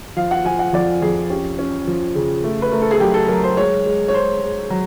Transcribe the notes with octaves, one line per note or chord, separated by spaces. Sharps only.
F3 F5
F#5
F3 G#5
F#5
F2 D5
F2 G#4
C#4 G4
C#4
F3
C#3
A3
B4
A3 A#4
A4
G#4
F#3 G4
A4
F#3 A#4
C5
G#3 C#5
G#3
C#5
G#3 C5
G#3
F#3